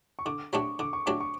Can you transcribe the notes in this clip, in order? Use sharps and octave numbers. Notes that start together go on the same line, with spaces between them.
C#6
D3 D6
F#3 A3 D4 G4 C#6
D3 D6
C#6
F#3 A3 D4 G4 D6
C#6